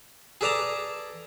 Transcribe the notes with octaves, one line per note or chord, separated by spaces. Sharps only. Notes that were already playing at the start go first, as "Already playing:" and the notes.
G#4 A4 B4 D5 A5 A#5